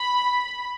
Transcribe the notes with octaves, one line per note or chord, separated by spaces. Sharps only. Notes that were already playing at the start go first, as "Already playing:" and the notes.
Already playing: B5